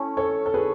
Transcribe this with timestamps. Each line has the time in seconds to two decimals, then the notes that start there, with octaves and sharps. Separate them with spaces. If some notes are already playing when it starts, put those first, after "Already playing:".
Already playing: A3 C#4 E4 A4 C#5
0.17 A4 C#5
0.46 A4
0.54 G#4 B4